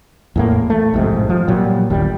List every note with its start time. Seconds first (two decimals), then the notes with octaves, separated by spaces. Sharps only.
0.36 E2 A2 A#3
0.70 A3
0.94 A1 F2 G#2 C3
1.29 F3
1.48 A#2 F#3 G3
1.90 G1 D#2 G3